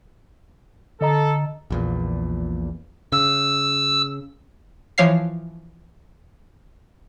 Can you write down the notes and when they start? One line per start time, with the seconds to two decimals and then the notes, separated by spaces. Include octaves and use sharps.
1.01 D3 A4 D#5 A#5
1.70 A#1 E2 A#2
3.12 C#3 E6
4.98 E3 F3 C#5 F5 C7